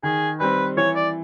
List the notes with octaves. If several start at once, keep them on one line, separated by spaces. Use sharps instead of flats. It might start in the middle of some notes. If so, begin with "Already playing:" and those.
D#3 G#4
G3 C4 B4
E3 C#5
D5